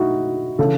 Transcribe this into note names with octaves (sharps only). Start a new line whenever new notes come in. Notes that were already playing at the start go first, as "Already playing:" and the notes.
Already playing: D#4 E4 F#4
C#3 E3 A4